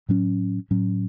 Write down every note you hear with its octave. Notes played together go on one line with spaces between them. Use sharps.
A2 F#3 C#4
A2 F#3 C#4